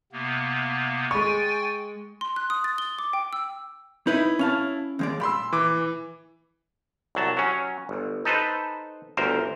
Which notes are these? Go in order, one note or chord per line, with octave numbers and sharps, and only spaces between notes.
C3 A#3 B3
G#3 G5 G#5 C#6 A6
C6
F#6
D#6
A6
G7
D6
G5
E6
D#4 E4 B4 D#5
C#4 F5 A5
D#2 G#3 D5
A#2 B5 C6 E6
E3 D6
C2 F#3 A5
F#3 C#4
G1
D#4 A4 B4 C5
G1 D2 A#4 C5